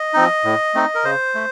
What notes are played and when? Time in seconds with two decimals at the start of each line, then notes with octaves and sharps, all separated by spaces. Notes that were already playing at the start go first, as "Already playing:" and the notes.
Already playing: D#5
0.14 F3 C4 D#4
0.44 A2
0.75 A3 C4 D#4
0.95 A#4
1.04 C#3 C5
1.35 A3